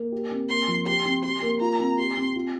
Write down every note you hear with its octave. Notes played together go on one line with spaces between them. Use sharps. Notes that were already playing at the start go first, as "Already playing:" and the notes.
Already playing: A#3
G4
C4
A#3 C6
F3
G4 C6
C4
G4 C6
A#3
F4 A#5
C4
G4 C6
C4
F4